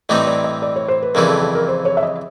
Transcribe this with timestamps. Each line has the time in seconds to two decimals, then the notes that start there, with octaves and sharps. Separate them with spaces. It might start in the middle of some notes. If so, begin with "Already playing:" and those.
0.09 A2 E3 G3 C4 D#4 D#5
0.27 D5
0.44 D#5
0.62 D5
0.76 C#5
0.88 C5
1.02 B4
1.15 F2 C#3 E3 G3 A#4
1.29 A4
1.41 A4
1.55 A#4
1.68 C5
1.85 C#5
1.97 E5
2.03 D#5